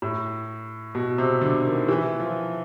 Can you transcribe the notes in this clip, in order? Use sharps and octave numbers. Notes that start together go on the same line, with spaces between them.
A2
B2
C3
D3
D#3
E3
F3